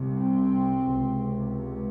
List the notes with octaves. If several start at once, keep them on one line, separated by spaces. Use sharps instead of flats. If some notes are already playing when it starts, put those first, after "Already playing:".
Already playing: C2 C3
C4
C#2 C3